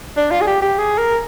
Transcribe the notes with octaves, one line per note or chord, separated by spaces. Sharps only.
D4
F4
G#4
G4
G4
G#4
A#4